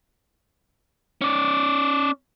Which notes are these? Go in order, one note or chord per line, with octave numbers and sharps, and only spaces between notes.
C#4 D5